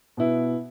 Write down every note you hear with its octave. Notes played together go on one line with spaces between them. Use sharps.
B2 B3 E4